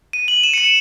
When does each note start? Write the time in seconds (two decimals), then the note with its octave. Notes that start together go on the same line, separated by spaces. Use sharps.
0.13 D#7
0.28 F#7
0.43 E7
0.54 C#7
0.58 D#7